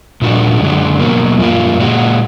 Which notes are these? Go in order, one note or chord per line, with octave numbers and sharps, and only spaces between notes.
A#2 F3 G#3 D4 F#4
F#2 D3 G#3 D4
B2 F#3 A#3
F#2 F3 A#3 F4
A#2 G#3 D4 F#4